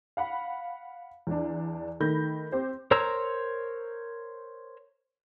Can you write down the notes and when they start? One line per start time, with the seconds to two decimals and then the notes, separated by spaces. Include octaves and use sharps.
0.17 F5 F#5 B5
1.27 E2 D4
2.00 D#3 A3 B5 G6 A#6
2.52 C4 G4 C5
2.91 A#4 C5 C#5 A#5 E6